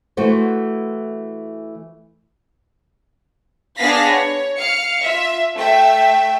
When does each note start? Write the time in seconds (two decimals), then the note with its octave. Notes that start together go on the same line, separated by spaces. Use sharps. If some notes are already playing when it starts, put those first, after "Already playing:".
0.17 E3 A3 F#4 C5
3.78 B3 D4 G#4 F5 A#6 B6
4.09 C#5
4.58 F5 F6 C#7
5.02 F4 E5
5.55 A3 E5 G5